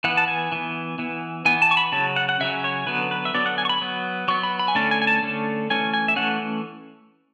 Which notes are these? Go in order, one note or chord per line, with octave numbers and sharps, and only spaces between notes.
E3 B3 F#5
A5
G#5
E3 B3
E3 B3
E3 B3 G#5
A5
C#6
B5
C#3 F#3 C#4 A5
F#5
F#5
C#3 F#3 C#4 E5
C#5
D3 F#3 B3 B4
B4
E5
D3 F#3 B3 D5
F#5
G#5
C#6
B5
F#3 B3
F#3 B3 C#6
B5
B5
G#5
D3 A3 C#4 A5
G#5
G#5
A5
D3 A3 C#4
E3 A3 C#4 G#5
G#5
E5
E3 A3 C#4 F#5